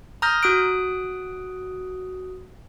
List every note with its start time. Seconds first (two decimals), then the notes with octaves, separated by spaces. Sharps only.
0.22 A#5 D#6 F6 G6 A#6
0.43 F#4 D#6 F#6 D7